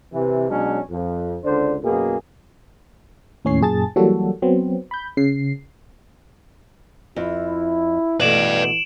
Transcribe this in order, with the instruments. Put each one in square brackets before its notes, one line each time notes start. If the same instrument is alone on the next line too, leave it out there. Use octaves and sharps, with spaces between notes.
[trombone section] C3 E3
B2 F#3 G#3 C#4 D4
F2
C#2 D3 D4 C5
F#2 B2 A#3 G#4
[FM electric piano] D#2 A2 C#4 C#5 C7
F#2 A#2 G#4 A5 A6
E3 F#3 G3 A#3 F#4 A4
F#3 B3 C4
B5 G6
C#3 C7
[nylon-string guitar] F2 [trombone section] E4
[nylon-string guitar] B2 A3 [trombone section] E3 [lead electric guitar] B4 D5 [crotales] D7 E7 F#7